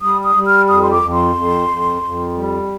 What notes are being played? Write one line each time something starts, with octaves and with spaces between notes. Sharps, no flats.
G3 D#6
D#6
G3
F6
F2 D#6
C6
D6
F2
C6
F2
F2
F2
G3